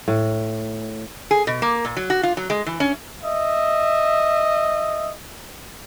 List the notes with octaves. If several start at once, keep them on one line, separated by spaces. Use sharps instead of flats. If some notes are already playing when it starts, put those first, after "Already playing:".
A2
G#4
B2
A#3
A#2
F#3
F#4
F4
F#3
G#3
E3
C#4
D#5 E5